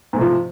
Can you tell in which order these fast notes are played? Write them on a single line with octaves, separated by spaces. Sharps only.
G#2 A3 C3 F3